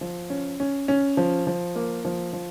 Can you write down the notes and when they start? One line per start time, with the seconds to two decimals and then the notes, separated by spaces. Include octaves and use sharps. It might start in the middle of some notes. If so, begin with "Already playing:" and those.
0.01 F3
0.30 C#4
0.60 C#4
0.88 C#4
1.17 F3
1.47 F3
1.75 A#3
2.05 F3
2.33 F3